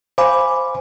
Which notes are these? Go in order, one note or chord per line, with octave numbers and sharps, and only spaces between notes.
C5 F5 G#5 B5 D6